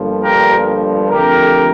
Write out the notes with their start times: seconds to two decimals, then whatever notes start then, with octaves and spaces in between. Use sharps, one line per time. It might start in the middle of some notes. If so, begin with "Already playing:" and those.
Already playing: G1 G2 F3 A#3
0.23 G4 A#4
1.09 F2 D3 A3 G4 A#4